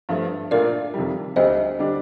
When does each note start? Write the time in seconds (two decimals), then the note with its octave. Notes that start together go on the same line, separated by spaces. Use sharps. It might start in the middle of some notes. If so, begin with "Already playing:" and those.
0.09 G2 F3 A3
0.51 A#2 A3 D4 F4 A#4 D5
0.94 F2 C3 D#3 G3
1.36 D2 D3 G3 C5 D#5
1.79 D3 G3 D4